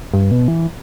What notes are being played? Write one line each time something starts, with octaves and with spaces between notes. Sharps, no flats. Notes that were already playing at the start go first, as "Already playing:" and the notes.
G2
B2
E3